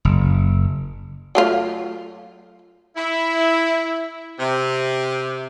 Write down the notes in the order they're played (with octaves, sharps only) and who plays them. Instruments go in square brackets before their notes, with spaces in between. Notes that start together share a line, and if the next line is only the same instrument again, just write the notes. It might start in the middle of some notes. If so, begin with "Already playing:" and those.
[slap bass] F#1
[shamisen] F#3 A3 F4
[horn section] E4
C3